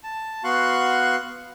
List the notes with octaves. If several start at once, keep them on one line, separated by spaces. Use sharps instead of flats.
A5
B3 F#4 F5 C6 C#6 F#6